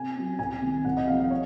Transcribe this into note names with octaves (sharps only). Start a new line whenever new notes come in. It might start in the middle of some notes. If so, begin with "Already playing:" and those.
Already playing: C3 G#5
F#3 C#4
C2 G#5
C3 D#3
C2 F#5
D#5
C3 F3 F5
F5
C#5